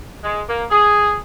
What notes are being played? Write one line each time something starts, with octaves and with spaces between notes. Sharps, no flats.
G#3
A#3
G#4